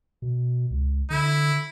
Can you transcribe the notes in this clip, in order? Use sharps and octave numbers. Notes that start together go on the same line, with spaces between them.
B2
C#2
D3 E4